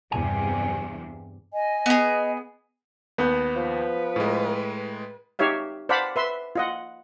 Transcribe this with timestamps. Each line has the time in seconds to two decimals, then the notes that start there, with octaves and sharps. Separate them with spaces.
0.12 E2 G2 C3 G#5
1.52 D#5 G#5
1.86 B3 G#4
3.18 D#2 B3 G6
3.56 F3 B4
4.16 A2 G#3
5.39 D#4 G4 C#5 E5 F5
5.89 C5 D5 F5 F#5 A5 B5
6.16 B4 E5 C6
6.56 F4 D#5 F#5